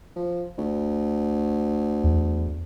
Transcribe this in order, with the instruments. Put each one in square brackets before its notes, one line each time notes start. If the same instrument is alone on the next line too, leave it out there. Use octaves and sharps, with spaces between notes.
[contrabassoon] F3
D2
[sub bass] E2